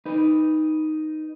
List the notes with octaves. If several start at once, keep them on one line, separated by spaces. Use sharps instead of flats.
D#4 B4